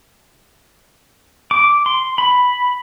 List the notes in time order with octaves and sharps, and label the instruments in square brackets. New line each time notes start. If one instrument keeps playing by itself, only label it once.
[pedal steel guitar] D6
C6
B5